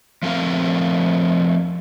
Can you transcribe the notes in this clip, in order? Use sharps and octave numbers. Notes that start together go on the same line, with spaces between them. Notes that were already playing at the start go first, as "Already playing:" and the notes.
F3 A3 C4 A#4 F5